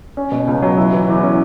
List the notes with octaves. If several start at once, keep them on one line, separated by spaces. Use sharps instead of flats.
C#4
B2
C#2
F#3
E4
E3
E2
C#4